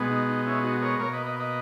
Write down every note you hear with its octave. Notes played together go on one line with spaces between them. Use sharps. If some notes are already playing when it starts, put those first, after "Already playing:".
Already playing: B2 G#3 B3
D#4
D#4
C#4 E4
D#4 F#4
A#4 C#5
B2 A#3 A#4 C#5
B4 D#5
B4 D#5
B4 D#5